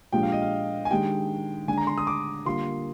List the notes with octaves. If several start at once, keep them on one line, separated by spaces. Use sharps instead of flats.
A#2 F3 G#3 D4 G4 G5
F5
D#5
F5
G#5
D#3 G#3 D4 G4 G5
D3 G#3 D4 G#5
A#5
C6
D#6
D6
D3 G3 A#3 F4 C6